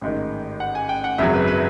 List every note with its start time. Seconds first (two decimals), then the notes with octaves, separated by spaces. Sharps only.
0.01 A1 G#2 D#3
0.60 F#5
0.75 G#5
0.89 G5
1.04 F#5
1.18 G#1 F#2 C#3 F#3 E5
1.34 B4
1.48 B4